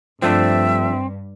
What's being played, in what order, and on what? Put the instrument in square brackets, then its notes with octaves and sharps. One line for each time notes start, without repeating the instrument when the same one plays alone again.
[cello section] G2 [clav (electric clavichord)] F3 A3 D4 [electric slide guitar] C4 [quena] E5